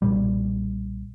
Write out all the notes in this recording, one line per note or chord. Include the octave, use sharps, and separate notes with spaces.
B1 A#2 G3